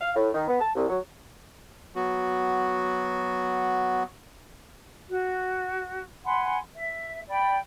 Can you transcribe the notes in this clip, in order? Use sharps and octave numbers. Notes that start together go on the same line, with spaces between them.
F5
A2
D#3
B3
A5
C2
F#3
F#3 B3 F#4
F#4
F#5 G#5 B5 C6
E5
D5 G5 B5